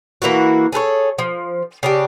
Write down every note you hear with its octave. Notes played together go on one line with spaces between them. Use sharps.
E3 A#3 E4 F#4
G#4 A4 B4 C#5
F3
C#3 D4 G4